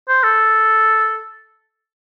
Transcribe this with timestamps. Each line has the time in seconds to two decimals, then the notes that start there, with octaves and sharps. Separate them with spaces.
0.09 C5
0.23 A4